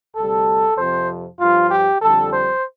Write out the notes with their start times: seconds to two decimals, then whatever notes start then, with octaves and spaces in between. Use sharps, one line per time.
0.16 D2 C3 G3 A4
0.78 F2 C3 F3 C5
1.40 G2 F3 F4
1.71 G4
2.02 F2 D3 G3 A4
2.33 C5